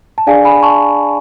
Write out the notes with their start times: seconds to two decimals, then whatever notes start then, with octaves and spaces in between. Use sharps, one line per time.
0.18 A5
0.27 D4 G#4 D5 F5 G#5
0.44 G#5 B5
0.63 A5 C#6